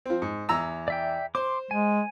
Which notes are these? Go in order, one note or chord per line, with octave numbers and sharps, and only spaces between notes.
F3 C4
G#2
E2 A#5 E6
D5 E5 G5
C5 C6 D6
G#3 G#5